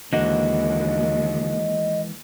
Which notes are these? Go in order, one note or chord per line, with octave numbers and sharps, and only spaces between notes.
D#2 D3 E3 G#3 A#3 F#4 D#5